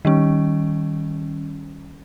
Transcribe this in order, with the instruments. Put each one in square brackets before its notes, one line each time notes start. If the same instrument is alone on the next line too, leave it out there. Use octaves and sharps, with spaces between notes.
[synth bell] D#3 G3 C#4